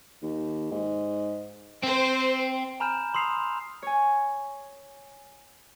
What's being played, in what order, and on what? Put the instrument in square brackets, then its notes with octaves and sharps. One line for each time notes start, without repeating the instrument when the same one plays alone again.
[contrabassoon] D#2
G#2
[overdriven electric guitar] C4 [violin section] C5
[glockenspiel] G#5 A#5 B5 F6 G6 E7
B5 C6 D#6 E6 C7 F7
[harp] C#5 G#5